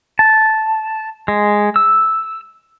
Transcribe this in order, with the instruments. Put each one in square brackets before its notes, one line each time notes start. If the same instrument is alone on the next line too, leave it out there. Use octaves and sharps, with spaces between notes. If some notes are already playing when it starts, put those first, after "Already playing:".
[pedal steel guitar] A5
G#3
E6